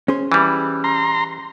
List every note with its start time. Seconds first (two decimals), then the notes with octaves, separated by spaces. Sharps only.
0.08 C#4 G#4 C5
0.32 E3 G3
0.84 A#5 C6